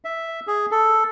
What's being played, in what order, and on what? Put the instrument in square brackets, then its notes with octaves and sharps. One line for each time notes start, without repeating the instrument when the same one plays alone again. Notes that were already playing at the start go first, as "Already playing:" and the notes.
[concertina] E5
G#4
A4